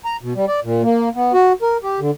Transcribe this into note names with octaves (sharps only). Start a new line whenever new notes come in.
A#5
B2
G3
D5
A#2
A#3
B3
F#4
A#4
G4
D3